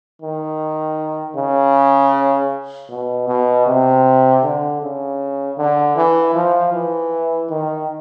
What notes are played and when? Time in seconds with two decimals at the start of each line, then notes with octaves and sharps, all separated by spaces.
0.22 D#3
1.36 C#3
2.90 B2
3.28 B2
3.67 C3
4.43 D3
4.82 C#3
5.58 D3
5.96 E3
6.35 F3
6.73 E3
7.50 D#3